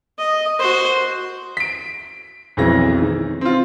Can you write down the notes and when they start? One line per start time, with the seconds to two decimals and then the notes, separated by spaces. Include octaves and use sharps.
0.18 D#5
0.59 F#4 C5
1.57 B6 D7
2.57 B1 F2 E3 G#3 A#6
3.00 D#3
3.41 C4 F4